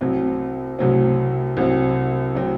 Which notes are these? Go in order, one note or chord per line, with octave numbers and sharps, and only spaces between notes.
C2 C3 F#3 C4
C2 C3 F#3 C4
C2 C3 F#3 C4
C3 F#3 C4